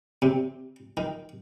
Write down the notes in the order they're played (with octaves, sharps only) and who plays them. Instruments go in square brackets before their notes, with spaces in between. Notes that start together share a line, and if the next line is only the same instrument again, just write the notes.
[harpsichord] C3
D#3